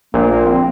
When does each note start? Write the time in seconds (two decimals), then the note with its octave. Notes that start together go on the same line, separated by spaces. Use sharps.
0.14 A#1 A#2 A#3
0.31 A#3
0.46 C4